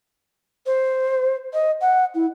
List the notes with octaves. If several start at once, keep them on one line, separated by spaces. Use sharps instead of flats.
C5
D#5
F#5
E4